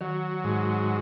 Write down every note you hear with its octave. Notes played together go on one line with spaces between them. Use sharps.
D#3 F#3
G#2